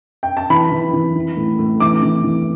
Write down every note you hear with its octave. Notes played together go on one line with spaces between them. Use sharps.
G5
A5
E3 B5
E3
E3
E3
A2
A2
E3 D6
E3
E3